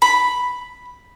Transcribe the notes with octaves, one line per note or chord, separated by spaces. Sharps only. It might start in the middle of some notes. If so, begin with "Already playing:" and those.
B5